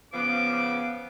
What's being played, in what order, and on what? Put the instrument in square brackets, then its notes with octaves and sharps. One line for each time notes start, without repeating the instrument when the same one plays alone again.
[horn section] C#3 F3 B3 [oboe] D6